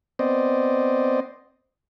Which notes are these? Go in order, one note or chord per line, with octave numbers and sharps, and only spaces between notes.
B3 C4 C5 D5 D#5